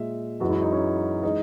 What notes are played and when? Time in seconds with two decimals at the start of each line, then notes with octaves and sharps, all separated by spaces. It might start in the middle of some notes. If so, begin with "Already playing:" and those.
Already playing: A#2 G#3 E5
0.40 F#2 E3 G#3 F#4
0.51 E4
0.62 D#4
0.72 C#4
1.23 E3 G#3 D#4